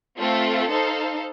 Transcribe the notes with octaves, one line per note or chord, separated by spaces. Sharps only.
A3 C4 F4 A4
D#4 A4 C5 F5